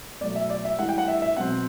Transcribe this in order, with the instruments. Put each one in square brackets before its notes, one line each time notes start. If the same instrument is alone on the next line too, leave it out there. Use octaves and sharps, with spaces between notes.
[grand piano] B2 F#3 A3 D5
E5
D5
E5
A2 E3 G3 D4 F#5
G5
F#5
E5
E5
B2 F#3 C4 F#5